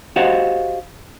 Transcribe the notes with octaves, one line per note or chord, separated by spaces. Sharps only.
F#4 G4 C5 D#5 F5 F#5